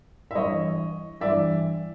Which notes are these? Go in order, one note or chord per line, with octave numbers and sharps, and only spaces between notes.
E5
G2 E3 C#5 D#5
G2 E3 D5 E5